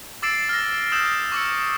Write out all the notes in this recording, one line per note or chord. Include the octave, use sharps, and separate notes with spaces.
D6 E6 A6 C7 D7 E7
F6 A#6
D#6 E6 G6 E7
C#6 D6 E6 C#7